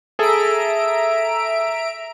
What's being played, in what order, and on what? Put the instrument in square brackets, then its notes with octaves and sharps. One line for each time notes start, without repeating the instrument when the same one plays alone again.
[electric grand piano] G#4 A4 [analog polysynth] E5 A#5 D7